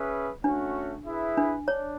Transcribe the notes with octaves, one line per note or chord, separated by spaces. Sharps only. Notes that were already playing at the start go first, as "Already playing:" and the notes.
Already playing: C#4 G#4 B4 E5
A3 C#4 D4 F#4
E4 G#4 B4 E5
D4
D4 C#5